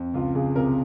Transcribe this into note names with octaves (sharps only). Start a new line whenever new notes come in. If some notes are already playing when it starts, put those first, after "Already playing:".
Already playing: F2
C#2 F4
C#2 G#4
C3 A#4